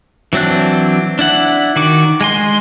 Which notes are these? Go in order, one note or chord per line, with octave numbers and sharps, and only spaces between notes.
E3 F#3 C4 D4 F#6
D4 E4 F#5
D#3 F#4 D6
G#3 G#5 C6